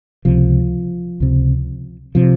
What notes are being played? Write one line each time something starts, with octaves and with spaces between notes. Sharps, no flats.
C#2 C3 F3
C#2 C3
C3 F3